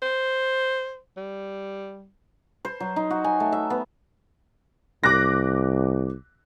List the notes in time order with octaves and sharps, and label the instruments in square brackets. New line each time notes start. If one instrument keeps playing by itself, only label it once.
[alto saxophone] C5
G3
[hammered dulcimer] C5
F#3
D#4
F#4
G#5
A3
E5
B3
[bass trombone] C2 [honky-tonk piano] D6 F#6 A#6